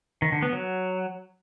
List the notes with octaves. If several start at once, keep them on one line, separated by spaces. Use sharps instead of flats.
D#3
D3
B3
F#3